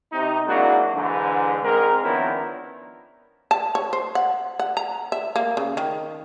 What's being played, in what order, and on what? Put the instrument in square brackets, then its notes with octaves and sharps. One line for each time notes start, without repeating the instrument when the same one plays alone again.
[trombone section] C3 D#4
F#3 G#3 A#3 D4 E4 F#4
G#2 D3 E3
G#2 G#3 C4 A#4
D#3 F3 B3 C#4 D4 E4
[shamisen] A5
C#5
C5
F#5
F#5
A#5
E5
A#3
C#3
D#3